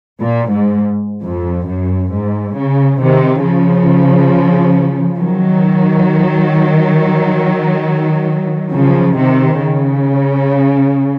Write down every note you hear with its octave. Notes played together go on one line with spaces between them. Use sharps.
A#2
G#2
F2
F#2
G#2
C#3
C3 D#3
C#3 F3
D#3 F#3
C#3 F3
C3 D#3
C#3